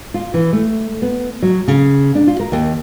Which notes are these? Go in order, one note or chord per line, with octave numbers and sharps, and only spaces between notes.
F4
E3
A3
B3
F#3
C#3
D4
F4
A#4
D#2